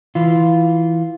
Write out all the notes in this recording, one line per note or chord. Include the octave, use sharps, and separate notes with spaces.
E3 F4